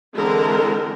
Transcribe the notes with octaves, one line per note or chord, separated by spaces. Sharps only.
D3 E3 G#3 C4 A4 A#4